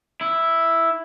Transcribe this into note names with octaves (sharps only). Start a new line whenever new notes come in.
E4